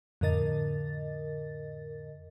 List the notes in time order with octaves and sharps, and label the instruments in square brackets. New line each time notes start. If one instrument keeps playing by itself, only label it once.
[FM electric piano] F2 A2 D3 A#4 D#5 A6